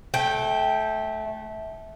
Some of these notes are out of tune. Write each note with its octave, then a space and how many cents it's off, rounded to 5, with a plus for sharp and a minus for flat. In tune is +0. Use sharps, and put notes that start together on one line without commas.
A3 -20 G5 +0